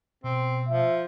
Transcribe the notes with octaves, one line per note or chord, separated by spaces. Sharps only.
B2 C4
F3 E5